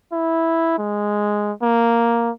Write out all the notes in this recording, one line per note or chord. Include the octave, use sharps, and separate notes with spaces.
E4
G#3
A#3